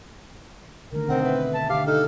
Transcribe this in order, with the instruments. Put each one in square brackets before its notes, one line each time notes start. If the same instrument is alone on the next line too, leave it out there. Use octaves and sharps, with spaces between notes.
[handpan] D3 D#3 A3 [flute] A#4
[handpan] B2 D#5 [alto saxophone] C4 [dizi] F#5
[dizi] B4 [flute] E5
[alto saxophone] A5
[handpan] D3 G4 [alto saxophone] F5 [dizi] D6
[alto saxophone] D#4 [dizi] A4 [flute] F6